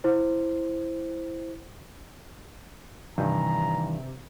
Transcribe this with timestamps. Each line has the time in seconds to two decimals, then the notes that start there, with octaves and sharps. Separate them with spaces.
0.04 E4 C5
3.18 G2 C3 D#3 E3 A#5